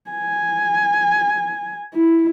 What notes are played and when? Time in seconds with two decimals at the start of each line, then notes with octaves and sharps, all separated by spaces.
0.11 G#5
1.94 E4